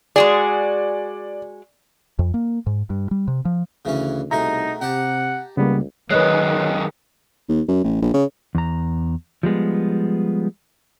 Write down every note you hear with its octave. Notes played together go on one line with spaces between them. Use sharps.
G#3 F#4 G#4 D5
F2
A#3
G#2
G2
G3
C3
F3
D2 C#3 E3 C#4
C2 B2 A3 D#4 G#4 A#5
C3 D#4 G4 F#5 A5
C#2 C#3 G3 A#3 B3
F#2 D#3 G#3 B4 C#5 D#5 F#6
D#2
F#2
A1
A#1
C#3
E2 A#5
F3 G3 G#3 B3